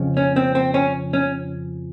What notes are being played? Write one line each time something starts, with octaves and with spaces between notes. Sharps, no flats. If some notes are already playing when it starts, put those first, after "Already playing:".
Already playing: F2 C#3 F3
C#4
C4
C4
C#4
C#4